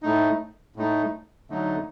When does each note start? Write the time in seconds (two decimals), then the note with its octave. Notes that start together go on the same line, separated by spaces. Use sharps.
0.03 A2 A3 D#4
0.76 A2 A3 D#4
1.50 D3 F#3 A3 D#4